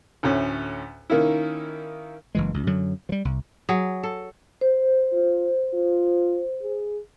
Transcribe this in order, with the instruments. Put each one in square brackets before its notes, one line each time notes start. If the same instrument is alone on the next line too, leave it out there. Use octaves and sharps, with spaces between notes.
[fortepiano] D2 A2 C#4
D#3 A#3 C#4 E4
[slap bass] F#1 E3 G#3
C#2
F#2 D3 F#3
F3 G3
C2
[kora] F#3 G#4
A4
[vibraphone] C5
[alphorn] F4
F4
G#4